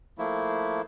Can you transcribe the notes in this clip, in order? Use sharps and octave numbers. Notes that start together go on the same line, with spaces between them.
F3 A3 A#3 E4